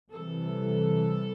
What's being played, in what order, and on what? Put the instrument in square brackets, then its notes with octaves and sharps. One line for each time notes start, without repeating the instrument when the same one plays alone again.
[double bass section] C3 E3 G3 [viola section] A4